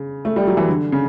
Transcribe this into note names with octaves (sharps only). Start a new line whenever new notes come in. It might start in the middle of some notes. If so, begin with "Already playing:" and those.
Already playing: C#3
A3
G3
F#3
E3
D3
C#3